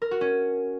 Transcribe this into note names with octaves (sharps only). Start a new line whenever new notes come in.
A#4
F#4
C#4